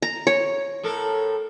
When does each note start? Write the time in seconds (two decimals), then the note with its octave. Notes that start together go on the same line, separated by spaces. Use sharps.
0.02 A#5
0.27 C#5
0.83 A2 A4 A#4